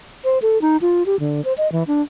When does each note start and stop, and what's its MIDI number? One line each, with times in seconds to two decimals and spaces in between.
0.24 0.38 72
0.42 0.60 69
0.62 0.77 63
0.81 1.03 65
1.06 1.19 67
1.20 1.44 50
1.45 1.53 72
1.58 1.70 75
1.72 1.83 52
1.87 2.02 62